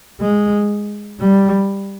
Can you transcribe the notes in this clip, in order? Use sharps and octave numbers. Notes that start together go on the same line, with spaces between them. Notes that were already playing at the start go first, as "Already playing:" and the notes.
G#3
G3